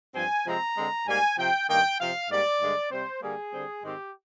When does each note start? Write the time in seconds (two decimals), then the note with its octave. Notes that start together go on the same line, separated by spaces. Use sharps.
0.14 G2 F3 C4 G#5
0.45 C3 F3 G#3 C4 A#5
0.76 D3 G#3 C4
1.07 G#2 G3 A#3 G#5
1.38 C3 F3 C4 G5
1.68 G2 D#3 A#3 G5
1.99 C3 F3 C4 F5
2.30 G#2 G3 A#3 D5
2.60 G2 D3 G#3
2.91 C3 G3 C4 C5
3.22 D3 G3 A#3 G#4
3.53 D3 G3 C4
3.84 G#2 D#3 G#3 C4 G4